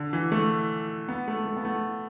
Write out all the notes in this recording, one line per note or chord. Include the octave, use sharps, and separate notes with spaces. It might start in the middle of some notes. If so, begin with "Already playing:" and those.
Already playing: D3
E3
A3
B3
A3
A3
B3
A3